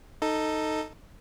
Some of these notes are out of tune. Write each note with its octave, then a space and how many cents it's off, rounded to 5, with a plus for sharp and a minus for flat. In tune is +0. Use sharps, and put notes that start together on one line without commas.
D#4 +0 A4 +10